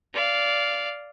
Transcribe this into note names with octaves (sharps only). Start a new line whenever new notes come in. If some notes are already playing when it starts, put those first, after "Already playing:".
D5 F5